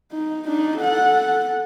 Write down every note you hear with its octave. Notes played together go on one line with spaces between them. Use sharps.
D#4
D4 D#4
A4 F#5